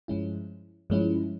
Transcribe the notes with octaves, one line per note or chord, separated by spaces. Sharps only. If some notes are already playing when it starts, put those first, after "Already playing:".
G2 F3 G#3 C#4 E4
G2 F3 G#3 C#4 E4